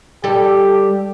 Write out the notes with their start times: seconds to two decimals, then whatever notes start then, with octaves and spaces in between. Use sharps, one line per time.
0.24 G3 G4 A4